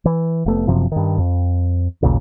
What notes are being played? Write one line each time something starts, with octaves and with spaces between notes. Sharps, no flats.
E3
F1 A3 B3
F#1 F#2 C3 F3
G2 D#3
F2
A1 D#2 A#2 C#3